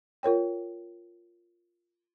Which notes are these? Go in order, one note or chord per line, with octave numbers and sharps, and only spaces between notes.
F4 A#4 C#5 G5